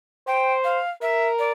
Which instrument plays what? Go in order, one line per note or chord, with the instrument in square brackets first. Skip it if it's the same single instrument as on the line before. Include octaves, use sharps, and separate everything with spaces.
[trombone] C5 [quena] G5
[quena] F5
[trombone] A#4 [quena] E5
[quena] D5